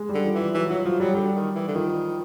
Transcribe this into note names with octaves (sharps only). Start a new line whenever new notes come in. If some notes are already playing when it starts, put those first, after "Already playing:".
Already playing: G#3
G3
D3
F3
E3 F3
E3 F#3
F3 F#3
F3 F#3
F#3 G3
D3 G3
D#3
E3
D3
D#3 F3